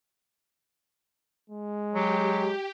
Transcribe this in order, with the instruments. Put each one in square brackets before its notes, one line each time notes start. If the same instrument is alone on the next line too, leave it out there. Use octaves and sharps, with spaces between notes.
[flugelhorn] G#3
[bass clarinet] F#3 [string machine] G4